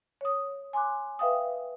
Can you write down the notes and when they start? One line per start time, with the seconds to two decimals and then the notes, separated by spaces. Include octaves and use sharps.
0.21 C#5 D#6
0.73 G#5 C6 D6 F#6
1.19 B4 E5 F5 G5 D#6